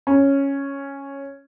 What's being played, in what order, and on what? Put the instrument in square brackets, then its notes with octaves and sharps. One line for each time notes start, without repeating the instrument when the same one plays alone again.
[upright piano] C#4